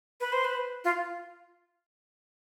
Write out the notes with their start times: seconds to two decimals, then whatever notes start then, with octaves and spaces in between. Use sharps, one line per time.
0.21 B4
0.32 C5
0.44 B4
0.84 F4